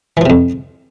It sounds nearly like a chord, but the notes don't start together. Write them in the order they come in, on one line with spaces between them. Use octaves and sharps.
E3 F3 C3 F2